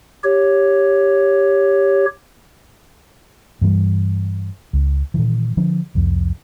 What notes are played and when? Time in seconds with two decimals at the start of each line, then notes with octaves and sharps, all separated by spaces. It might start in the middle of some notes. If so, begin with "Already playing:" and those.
0.24 G4 C#5
3.61 G2 E3 G3
4.73 C#2
5.14 A#2 D#3 E3
5.57 D3 F3 D4
5.95 C2 F2